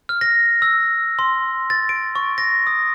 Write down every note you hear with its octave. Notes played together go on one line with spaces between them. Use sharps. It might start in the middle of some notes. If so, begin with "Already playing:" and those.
F6
A#6
E6
C6
A6
D7
C#6
A#6
D#6